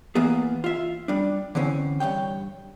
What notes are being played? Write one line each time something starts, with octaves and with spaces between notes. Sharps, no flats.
E3 A#3 B3 G#4
F4 E5
G3 D4
D3 E3 C4 C#4
G2 A#2 C#5 G5